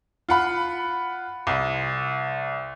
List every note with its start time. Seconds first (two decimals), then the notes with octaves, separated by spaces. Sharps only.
0.29 F4 F#5 B5
1.47 C2